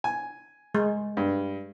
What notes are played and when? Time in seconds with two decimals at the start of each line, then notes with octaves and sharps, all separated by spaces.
0.04 G#5
0.75 G#3
1.17 G2